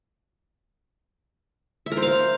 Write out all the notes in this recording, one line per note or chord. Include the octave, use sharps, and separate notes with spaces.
E5
A#4
C5
F5